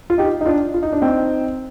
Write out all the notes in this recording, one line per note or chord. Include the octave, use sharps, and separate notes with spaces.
F4
D#4 G4
D#4
D4 F4
F4
D#4
D4
C4 D#4